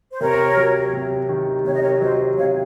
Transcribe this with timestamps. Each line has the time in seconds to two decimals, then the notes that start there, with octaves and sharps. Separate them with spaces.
0.12 C5
0.21 C3 A#4 C#5
0.57 F#3
0.93 C3
1.29 D#3
1.65 C3 C#5
1.74 D#5
1.82 A#4 C#5
2.01 F#3 C5 D#5
2.38 C3 C#5 F5